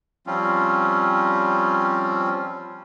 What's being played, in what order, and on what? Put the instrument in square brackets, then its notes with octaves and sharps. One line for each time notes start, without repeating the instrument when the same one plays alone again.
[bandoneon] F3 G3 C4 C#4 F4